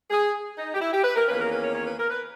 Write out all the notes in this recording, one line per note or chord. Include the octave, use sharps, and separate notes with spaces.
G#4
D#4
G4
E4
G4
B4
A#4
E2 D#3 A#3 C#4 B4
A#4
B4
C#5
C#5
B4
A#4
B4